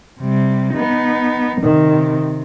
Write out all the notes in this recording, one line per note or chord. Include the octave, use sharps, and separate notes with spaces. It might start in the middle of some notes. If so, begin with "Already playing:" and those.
C3 G3
B3 D#4
C3 D#3